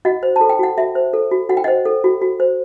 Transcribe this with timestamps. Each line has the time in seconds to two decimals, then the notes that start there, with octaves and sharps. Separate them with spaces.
0.05 F#4 D#5 F#5
0.23 C5
0.36 A5
0.41 A4
0.49 G5
0.59 F#4 F#5
0.78 F#4 E5
0.95 C5
1.13 A4
1.31 F#4
1.49 F#4 F#5
1.57 G5
1.64 C5 D#5 F#5
1.85 A4
2.04 F#4
2.22 F#4
2.40 C5